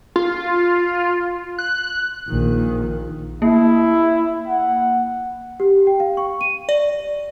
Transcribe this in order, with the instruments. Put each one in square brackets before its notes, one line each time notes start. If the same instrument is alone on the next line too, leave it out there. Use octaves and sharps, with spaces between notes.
[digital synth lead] F4
F#6
[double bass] A#1 D#3
[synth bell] A#3 [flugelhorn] E4
[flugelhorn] F#5
[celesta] G4
G5
F5
C#6
D#7
[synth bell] D5